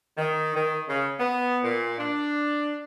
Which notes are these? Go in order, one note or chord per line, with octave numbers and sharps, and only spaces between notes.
D#3
D#3
C#3
B3
A#2
D4